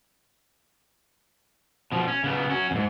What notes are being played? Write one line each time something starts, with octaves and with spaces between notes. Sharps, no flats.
B2 F3
C#4
C#3 B3
C#4 F#4
E2 G#2